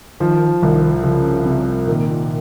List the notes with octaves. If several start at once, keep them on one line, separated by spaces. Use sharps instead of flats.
D#3 F3
C2 D#3
C#3 F3
C3
A#2 D#3